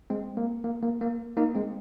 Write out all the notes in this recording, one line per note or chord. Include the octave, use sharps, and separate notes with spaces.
G#3 C4
A#3
A#3
A#3
A#3
A#3 D#4
G#3 C4